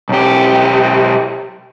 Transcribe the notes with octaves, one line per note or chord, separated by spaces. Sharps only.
B1 G4